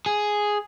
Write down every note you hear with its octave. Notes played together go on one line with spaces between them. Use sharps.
G#4